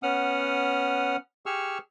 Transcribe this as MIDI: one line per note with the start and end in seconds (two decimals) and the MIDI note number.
0.03 1.17 59
0.03 1.17 61
0.03 1.17 78
0.03 1.17 87
0.03 1.17 89
1.46 1.78 67
1.46 1.78 68
1.46 1.78 85
1.46 1.78 88
1.46 1.78 89